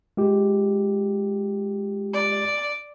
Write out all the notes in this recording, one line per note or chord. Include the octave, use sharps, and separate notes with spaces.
G#3 F4 G4
D5